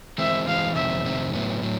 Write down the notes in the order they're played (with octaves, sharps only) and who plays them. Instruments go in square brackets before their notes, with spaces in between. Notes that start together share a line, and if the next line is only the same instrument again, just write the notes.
[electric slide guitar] E3 G#3 C4 [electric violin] E5
[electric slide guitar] E3 G#3 C4 [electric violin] F5
[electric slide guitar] F2 C3 D#3 G#3 C4 [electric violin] E5
[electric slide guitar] F2 C3 D#3 G#3 C4
A2 F#3 B3
A2 F#3